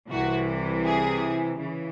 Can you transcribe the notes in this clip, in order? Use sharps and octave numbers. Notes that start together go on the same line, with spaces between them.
C2 C3 E3 F#4
G#4
C#3 E3